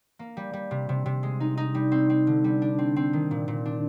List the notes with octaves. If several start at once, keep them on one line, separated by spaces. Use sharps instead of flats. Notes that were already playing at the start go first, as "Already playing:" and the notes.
A#3
G3
G3
C3
C3
C3
G#3
D#4
D#4
G3
C4
C4
D3
G3
D4
C4
C4
D#3
A#2
A#2
D4